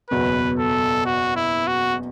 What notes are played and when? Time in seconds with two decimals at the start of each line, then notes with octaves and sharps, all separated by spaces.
0.11 F#1 E2 B2 F#3 B4
0.59 A4
1.06 F#4
1.36 E4
1.68 F#4